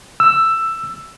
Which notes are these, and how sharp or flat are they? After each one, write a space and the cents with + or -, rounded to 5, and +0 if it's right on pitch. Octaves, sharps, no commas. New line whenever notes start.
E6 +10